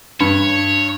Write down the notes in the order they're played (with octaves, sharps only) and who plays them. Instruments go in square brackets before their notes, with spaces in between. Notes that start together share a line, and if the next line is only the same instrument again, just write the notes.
[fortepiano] G2 [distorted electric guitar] C#5